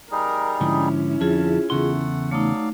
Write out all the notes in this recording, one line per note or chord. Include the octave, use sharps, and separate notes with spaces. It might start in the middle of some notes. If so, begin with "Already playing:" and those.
G3 D#4 G#4 A#4
G#2 D3 F3 C#4 E4
F2 D3 F4 G#4 A5
E2 C#3 A3 F#5 C6
F#3 A3 D#4 D5 F5